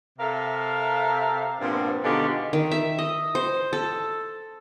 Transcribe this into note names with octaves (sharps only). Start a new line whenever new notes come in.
C3 A4 A#4 E5 F5
G2 A#2 F3 B3 C4
B2 D3 D#3 G#3 F4 G4
D#3
E5
D#5
C5
A4